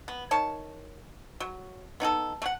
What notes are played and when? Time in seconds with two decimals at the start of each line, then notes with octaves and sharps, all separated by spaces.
0.08 B3
0.31 D#3 C#5 A5
1.40 F#3
2.00 B3 D#4 G#4 A4
2.42 A3 F#5